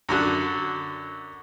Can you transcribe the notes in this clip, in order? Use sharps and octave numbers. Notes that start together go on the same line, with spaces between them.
F#2 D3 F#4